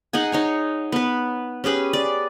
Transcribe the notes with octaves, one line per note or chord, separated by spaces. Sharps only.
D#4 G#4 F#5 G#5
D#4 C#5 G#5
B3 B4
C#4 G4 G#4 B4
D5